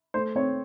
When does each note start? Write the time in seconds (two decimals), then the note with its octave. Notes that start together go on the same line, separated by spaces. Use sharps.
0.14 A3 C5
0.36 C4 C#5